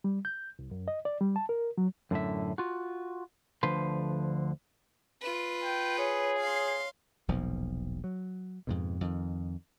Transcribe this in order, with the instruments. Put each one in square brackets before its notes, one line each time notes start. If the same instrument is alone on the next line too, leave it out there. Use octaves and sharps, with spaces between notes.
[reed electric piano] G3
G6
C2
F#2
D#5
D5
G3
A5
A#4
F#3
[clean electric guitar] F#2 A2 D3 E5
F4 F#4
D2 D3 F3 B4 C5 C6
[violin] F4 B4
[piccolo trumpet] G5
[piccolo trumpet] G#4 [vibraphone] C#5
[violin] F5 C6
[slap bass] E1 B1 A#2 F3
F#3
F2 G#2 B2
F2 D#3